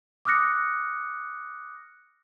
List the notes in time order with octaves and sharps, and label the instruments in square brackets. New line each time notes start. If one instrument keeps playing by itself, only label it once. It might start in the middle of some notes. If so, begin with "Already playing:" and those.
[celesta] D6 D#6 F6 F#6 A#6 C#7